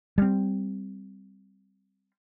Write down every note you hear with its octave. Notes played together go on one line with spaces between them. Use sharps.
G3 C4